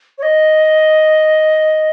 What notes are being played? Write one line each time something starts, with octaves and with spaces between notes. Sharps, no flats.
C#5
D#5